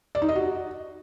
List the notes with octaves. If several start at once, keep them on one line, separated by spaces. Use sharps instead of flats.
D5
D#4
D#5
F#4